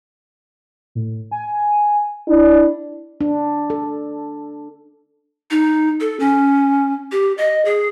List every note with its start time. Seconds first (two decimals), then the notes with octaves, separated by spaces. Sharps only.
0.95 A2
1.31 G#5
2.28 D4 E4
3.21 D4
3.70 A4
5.51 D#4
6.00 A4
6.20 C#4
7.12 G4
7.38 D#5
7.65 G#4